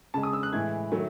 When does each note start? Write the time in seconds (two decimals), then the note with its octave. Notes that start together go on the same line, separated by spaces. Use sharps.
0.14 C#3 G#3 A5
0.23 D#6
0.33 E6
0.43 F#6
0.52 A2 E3 G#3 G#6
0.92 D#3 F#3 A3